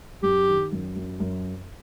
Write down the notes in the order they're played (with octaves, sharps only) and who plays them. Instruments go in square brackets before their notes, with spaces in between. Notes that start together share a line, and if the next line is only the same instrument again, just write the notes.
[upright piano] F#2 [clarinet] G4
[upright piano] D#3
F#2
F#2
F#2